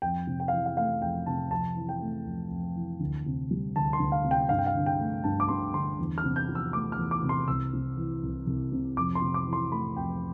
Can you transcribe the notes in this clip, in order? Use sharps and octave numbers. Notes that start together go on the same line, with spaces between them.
F2 G5
C3
G5
F5
E3
F5
A3 F5
F2 G5
C3 A5
F2 A5
E3
G5
A3
F2
F2
E3
D2
C3
G3
D2 A5
C6
D2
F5
C3
G5
G2 F5
G5
F5
D3
G5
A3
G2 A5
D6
G2 C6
D3 C6
E2
F6
C3
G6
F3
E6
A3 D6
F6
E2
D6
C3
C6
C2 E6
C3
E3
C2
C2
C3
F2 D6
C6
C3
D6
E3
C6
A3 B5
F2 G5